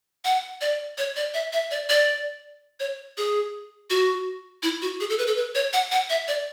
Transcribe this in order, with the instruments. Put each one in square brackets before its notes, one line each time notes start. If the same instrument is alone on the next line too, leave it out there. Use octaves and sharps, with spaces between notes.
[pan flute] F#5
D5
C#5
D5
E5
E5
D5
D5
C#5
G#4
F#4
E4
F#4
G#4
A4
B4
A4
B4
C#5
F#5
F#5
E5
D5